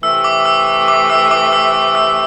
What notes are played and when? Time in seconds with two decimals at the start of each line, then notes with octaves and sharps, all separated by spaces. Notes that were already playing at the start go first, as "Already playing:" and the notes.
0.03 C3 E3 A3 E6
0.24 D6
0.46 E6
0.88 D6
1.10 E6
1.31 D6
1.53 E6
1.95 E6